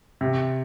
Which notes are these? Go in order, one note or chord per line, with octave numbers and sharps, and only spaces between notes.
C3